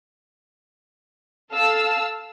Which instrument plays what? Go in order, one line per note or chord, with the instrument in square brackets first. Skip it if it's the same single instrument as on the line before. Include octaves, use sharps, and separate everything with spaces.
[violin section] A4 F5 A5 E6